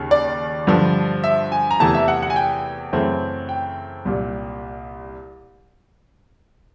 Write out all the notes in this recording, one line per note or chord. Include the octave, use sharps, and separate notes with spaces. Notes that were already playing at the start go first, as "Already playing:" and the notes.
Already playing: D#2 C#3
D5
G2 D3 F3
E5
G#5
A#5
E2 C3 E3 A3 A5
E5
F#5
F#5
G#5
G5
F#2 C#3 E3 A3 C4
G5
C2 A#2 G3